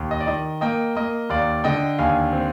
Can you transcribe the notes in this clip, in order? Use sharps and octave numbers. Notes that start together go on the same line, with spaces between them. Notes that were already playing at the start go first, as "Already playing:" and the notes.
Already playing: D#2
D#5
D5
D#3 D#5
A#3 D#5 G5
A#3 D#5
D#2 D5 F5
D3 D#5 G5
D#2 F5 G#5
C4